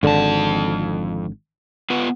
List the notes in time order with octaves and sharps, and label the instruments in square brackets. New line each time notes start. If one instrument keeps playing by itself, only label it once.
[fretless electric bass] G#1 D3 [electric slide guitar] F2 A5
[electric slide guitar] B3 F4 B4